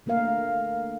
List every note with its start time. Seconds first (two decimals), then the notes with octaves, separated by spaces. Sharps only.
0.06 D3 A3 A#3 A#4 F5